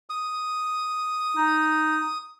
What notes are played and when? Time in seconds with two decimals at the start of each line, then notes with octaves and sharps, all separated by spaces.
0.10 D#6
1.37 D#4